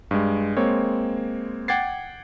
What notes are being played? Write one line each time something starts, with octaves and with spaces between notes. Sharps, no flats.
G2 G#3
G#3 A#3 C4 C#5
F#5 G5 D6 G#6 A6 C7